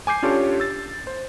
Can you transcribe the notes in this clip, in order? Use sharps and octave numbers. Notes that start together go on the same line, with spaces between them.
G#5 D6 G6 C7
C#4 D4 F4 G4 A4 C#5
E6 A6
C5